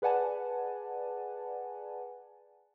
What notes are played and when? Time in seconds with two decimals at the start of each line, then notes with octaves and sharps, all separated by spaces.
0.02 G#4 B4 D5 F#5 G#5 A5